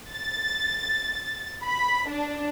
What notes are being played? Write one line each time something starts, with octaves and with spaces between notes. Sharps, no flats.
A6
B5
D4